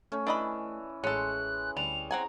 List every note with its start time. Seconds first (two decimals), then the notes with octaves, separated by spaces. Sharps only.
0.12 A3 C#4
0.27 E3 D4 D#5 B5
1.04 A1 G#3 C#4 A4 F#6
1.77 D2 G3 F7
2.11 C4 F#5 G#5 A#5